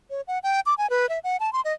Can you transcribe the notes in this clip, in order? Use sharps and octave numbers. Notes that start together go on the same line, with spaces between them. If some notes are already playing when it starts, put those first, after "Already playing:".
C#5
F#5
G5
D6
G#5
B4
E5
F#5
A5
C6
D#5